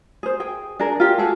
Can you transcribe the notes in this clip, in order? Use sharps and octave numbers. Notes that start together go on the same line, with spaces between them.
G#4 C5
G#4 G5
D4 G#4 A#4
F4 G4
F#4 G#4 A4